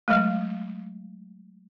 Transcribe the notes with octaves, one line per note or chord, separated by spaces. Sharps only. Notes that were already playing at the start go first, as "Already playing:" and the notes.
F#3 G#3 A3